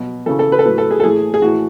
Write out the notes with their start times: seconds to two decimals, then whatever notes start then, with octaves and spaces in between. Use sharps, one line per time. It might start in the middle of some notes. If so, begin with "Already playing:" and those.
Already playing: B2 F#3
0.26 C#3 E3 A4
0.39 A4
0.52 B4
0.59 A4
0.65 A2 F#3 B4
0.78 A4
0.91 G#4
1.00 A4
1.04 A2 E3 G#4
1.34 G#4
1.42 A2 E3 F#4